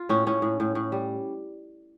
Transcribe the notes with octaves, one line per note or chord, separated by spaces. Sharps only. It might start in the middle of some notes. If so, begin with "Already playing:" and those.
Already playing: F4
A2 C#4
A2 C#4
A2
A2
A2
G3